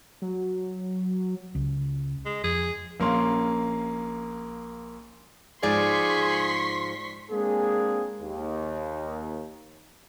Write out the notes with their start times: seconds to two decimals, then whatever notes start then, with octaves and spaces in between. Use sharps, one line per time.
0.22 F#3
1.55 C#2
2.25 G#3
2.44 F2 G#4
3.00 A#1 A#3 C#4 C6
5.63 G#2 F3 G#4 D5 C6 C#6 B6
7.31 G#3 A#3 C4 D4 G#4
8.21 D#2